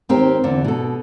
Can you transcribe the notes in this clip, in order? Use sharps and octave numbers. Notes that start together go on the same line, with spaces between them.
D#2 C4 G4 A#4
E2 D3
B2 A4